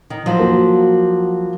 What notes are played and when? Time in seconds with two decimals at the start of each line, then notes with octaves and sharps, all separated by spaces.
0.10 D#3
0.26 F3 F#3
0.39 A#3 F#4